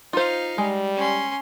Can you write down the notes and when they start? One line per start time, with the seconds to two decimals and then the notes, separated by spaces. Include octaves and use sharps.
0.13 D#4 F4 C5 F5
0.58 G3 G#3
0.96 C#4 C6